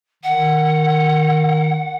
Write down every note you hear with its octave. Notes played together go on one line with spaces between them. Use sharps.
D#3 F#5